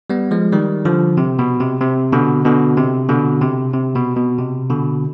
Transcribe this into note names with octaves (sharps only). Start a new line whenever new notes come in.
G3 B3
F3 G#3
D#3 G3
D3 F3
C3
B2
C3
C3
B2 D3
B2 D3
C3
B2 D3
C3
C3
B2
B2
C3
B2 D3